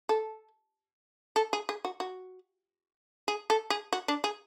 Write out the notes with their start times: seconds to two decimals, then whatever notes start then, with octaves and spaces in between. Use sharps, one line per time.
0.09 A4
1.36 A4
1.53 G#4
1.69 G#4
1.85 F#4
2.00 F#4
3.28 G#4
3.50 A4
3.70 G#4
3.93 F#4
4.08 D4
4.24 G#4